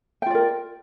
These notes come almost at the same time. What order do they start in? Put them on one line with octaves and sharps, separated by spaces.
G5 F4 D5 A#4